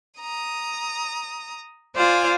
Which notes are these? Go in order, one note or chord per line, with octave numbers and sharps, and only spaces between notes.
A#5 D#6
F4 C5 D5 G#5